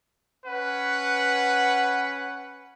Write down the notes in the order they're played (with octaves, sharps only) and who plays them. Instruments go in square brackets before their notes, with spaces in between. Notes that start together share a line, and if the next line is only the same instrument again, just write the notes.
[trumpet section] C#4 B4 F#5